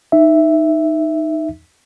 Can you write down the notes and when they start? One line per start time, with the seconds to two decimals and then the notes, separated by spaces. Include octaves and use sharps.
0.12 D#4 E5